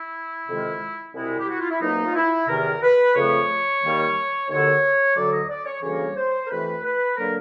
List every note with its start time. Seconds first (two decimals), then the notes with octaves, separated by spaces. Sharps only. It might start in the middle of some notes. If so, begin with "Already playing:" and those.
Already playing: E4
0.48 F2 C3 D#3 G#3
1.14 C2 B2 G#3 E4
1.39 G4
1.49 F#4
1.60 F4
1.71 E4
1.81 C2 B2 F#3 A#3 D#4
2.06 F4
2.15 E4
2.48 E2 C3 D#3 A#4
2.82 B4
3.15 F2 C#3 F3 A3 C#5
3.83 D#2 D#3 G3 A#3
4.49 D#2 D3 F#3 C#5
5.16 D2 D3 F#3 D5
5.33 D#5
5.49 D5
5.66 C#5
5.82 D2 C#3 E3 G3 A#3 C#5
6.17 C5
6.45 A#4
6.49 F2 C3 E3 A3 B4
6.83 B4
7.16 D3 F#3 A#3 A#4